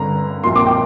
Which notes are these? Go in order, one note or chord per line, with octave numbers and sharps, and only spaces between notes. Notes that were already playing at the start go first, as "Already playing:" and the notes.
Already playing: G2 D3 A#5
A#1 A#2 A#3 C6
D6
G5 C6